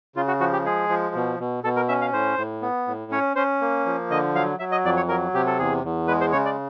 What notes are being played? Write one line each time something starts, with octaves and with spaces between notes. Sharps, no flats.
C#3 F4
F#4
F3 F#4
G4
G#3 G#4
F3
B2
B2
B2 A4
A#4
C#4 E5
F5
A2 C5
A2
B3
A2
C#4 C#5
C#4 C5
A#3
F3
D3 D#5
F#3 F5
F#3 E5
D#5
F2 D5
C#5
F#3 A#4
C3 G4
A4
E2 G#4
E2
G#3 B4
C5
C#3 C#5
D5